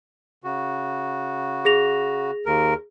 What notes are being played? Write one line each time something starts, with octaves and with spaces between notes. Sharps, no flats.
C#3 F#4
G#4 A#6 F7
D#2 A#4